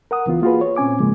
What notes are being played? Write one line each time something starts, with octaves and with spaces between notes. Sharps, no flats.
A#4 F#5 D#6
C#2 E3 B3 F4
A#3 F4 F#4 G#4 B4
C#5
A#2 C4 C#4 G#5 D6
G#2 C#3 F3 G#3 A#3